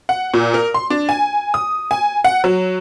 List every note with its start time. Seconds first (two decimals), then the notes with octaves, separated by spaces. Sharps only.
0.09 F#5
0.34 A#2
0.54 A#4
0.74 C6
0.90 D4
1.09 G#5
1.54 D#6
1.91 G#5
2.24 F#5
2.44 F#3